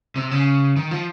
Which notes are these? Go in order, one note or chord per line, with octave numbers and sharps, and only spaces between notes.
C3
C#3
D#3
F3